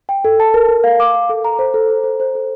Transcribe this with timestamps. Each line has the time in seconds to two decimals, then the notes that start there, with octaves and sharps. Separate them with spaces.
0.09 G5
0.25 A4
0.40 A5
0.54 A#4
0.69 A#4
0.84 F5
1.00 D6
1.14 F5
1.29 A4
1.45 A#5
1.59 C5
1.74 A4
1.90 C5
2.04 C5
2.20 C5
2.35 A4